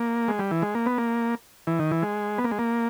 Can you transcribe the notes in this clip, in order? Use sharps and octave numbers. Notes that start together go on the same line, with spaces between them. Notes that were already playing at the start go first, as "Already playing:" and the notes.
Already playing: A#3
G#3
G3
E3
G#3
A#3
B3
A#3
E3
D#3
E3
G#3
B3
A#3
G#3
A#3